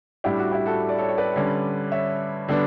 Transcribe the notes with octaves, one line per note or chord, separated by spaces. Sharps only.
A2 G3 D4 E4 G4
F#4
E4 G4
F#4 A4
D5
A4 C#5
C#5
B4 D5
D3 G3 C#4
C#5 E5
D3 G3 B3 D4